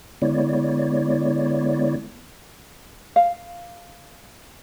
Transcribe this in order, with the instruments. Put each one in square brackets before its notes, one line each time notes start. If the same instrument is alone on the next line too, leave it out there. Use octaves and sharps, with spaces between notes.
[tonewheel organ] D3 G#3 B3 E4 C#5 D5
[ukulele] F5